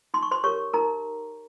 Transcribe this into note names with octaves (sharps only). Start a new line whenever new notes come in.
D#4 C6
C#6
C5 C6
G4 A#4 C#5 C#6
D#4 A#4 A#5